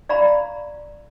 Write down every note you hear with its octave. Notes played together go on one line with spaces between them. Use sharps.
D5 F5 A#5 B5